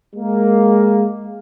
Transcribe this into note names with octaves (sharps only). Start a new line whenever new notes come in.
G#3 A#3